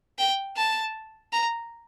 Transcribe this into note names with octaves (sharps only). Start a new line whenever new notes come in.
G5
A5
A#5